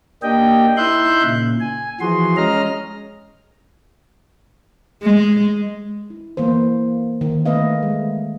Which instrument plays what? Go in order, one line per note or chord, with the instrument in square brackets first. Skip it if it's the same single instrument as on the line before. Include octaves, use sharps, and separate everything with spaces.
[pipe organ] A#3 D4 G4 D#5 G5
D#4 E4 E5 C6 F#6 G6
A#2 C#3
G#5
E3 F3 F#4 G#4 C6
G#3 C#4 D#5 A#5 F6
[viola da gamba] G#3
[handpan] E4
E3 A#3 B3 C5
D#3
A3 B3 B4 D#5 F5
G#3